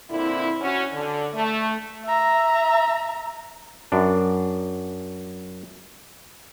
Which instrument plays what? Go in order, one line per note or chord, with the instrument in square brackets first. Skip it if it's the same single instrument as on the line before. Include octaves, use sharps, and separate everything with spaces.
[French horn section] A#2 D3 C4 E4
C#4 F#4
D3
A3
[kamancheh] E5 A#5
[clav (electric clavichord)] F#2 D4